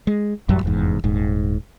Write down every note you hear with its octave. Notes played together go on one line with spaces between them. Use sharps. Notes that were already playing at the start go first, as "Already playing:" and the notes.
G#3
A1 F#2 F#3 G3
F1 E2 G#2
D#1 G#2